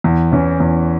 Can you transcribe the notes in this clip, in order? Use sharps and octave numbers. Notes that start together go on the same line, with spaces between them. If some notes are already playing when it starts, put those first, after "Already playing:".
E2
E3 C#4
E2